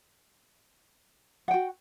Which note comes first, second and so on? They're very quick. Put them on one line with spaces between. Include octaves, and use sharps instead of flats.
F#5 G5 F#4